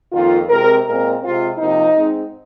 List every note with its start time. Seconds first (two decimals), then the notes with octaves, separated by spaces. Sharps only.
0.12 F2 D#3 A#3 F4
0.49 C3 G#3 C4 A#4
0.85 A#2 G#3 C4 A#4
1.22 C3 G#3 C4 F4
1.57 C3 F3 A#3 D#4
1.94 G#2 G#3 C4